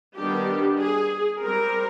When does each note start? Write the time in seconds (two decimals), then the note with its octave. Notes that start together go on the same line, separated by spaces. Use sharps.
0.15 D#3 G3 B3 D4 G4
0.79 G#4
1.42 G3 C4 A#4